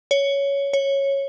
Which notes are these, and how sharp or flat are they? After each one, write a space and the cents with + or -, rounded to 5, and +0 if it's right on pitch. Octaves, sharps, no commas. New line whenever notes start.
C#5 +10
C#5 -10